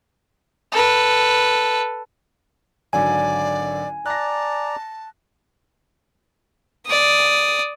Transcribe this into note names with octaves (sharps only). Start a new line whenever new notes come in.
A4 B4
G#1 D3 F#3 D5 G#5
D5 A5 A#5 F#6 A#6
D5 D#6